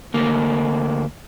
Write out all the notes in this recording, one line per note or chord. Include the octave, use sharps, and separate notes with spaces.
D2 A#3